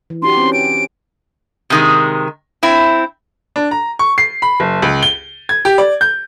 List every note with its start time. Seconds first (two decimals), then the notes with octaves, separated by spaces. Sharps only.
0.10 E3
0.22 D4 F#4 G4 C6
0.37 C4 C#4
0.53 D7
1.70 C3 D#3 G#3
2.63 C4 E4
3.56 D4
3.71 A#5
3.99 C#6
4.18 C7
4.42 B5
4.60 F#1
4.82 C#2
5.03 G7
5.49 G#6
5.65 G4
5.78 D5
6.01 G6